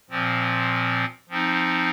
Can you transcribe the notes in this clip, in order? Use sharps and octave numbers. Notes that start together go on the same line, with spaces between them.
A#2 F3 C4
F3 C4 D#4